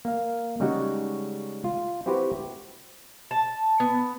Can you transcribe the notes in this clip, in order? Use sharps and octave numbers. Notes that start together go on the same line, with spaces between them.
A#3 F5
C#3 G3 G#3 D#4 F#4
F4
C4 E4 F#4 G4 B4 C5
A5
B3